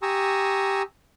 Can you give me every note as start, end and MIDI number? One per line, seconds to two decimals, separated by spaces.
0.02 0.82 67
0.02 0.82 80
0.02 0.82 82
0.02 0.82 85
0.02 0.82 87
0.02 0.82 88